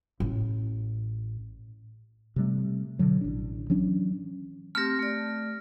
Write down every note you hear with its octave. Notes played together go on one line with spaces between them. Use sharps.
A1
C3 G3 A3
B2 D3 F#3
A1 D4
E3 F#3 C#4 D4
A3 C4 G4 F6 A#6
A3 D5